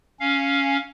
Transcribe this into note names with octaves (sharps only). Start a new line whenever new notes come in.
C#4 F5